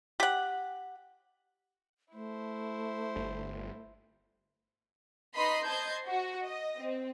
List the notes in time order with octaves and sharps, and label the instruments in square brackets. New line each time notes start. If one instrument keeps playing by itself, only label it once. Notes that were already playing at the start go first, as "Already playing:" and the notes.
[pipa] G4 F#5
[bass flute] A3 [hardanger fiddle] E4 C5
[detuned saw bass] G1
[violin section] D#4 B4 D#5 B5 C6
C5 D#5 A5 C6 G6 G#6
F#4
D#5
C4